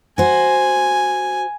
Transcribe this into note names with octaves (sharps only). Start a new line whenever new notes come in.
F#4 C5 G#5